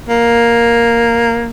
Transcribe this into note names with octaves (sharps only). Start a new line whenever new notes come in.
A#3